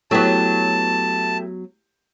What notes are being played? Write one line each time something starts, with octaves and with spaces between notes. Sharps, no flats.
F#3 A3 B3 E4 G4 A5